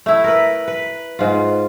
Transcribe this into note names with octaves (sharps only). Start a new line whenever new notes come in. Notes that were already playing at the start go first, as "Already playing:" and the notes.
A3 E4
A#4 B4
B4
G#2 F4